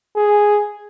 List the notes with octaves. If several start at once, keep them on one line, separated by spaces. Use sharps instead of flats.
G#4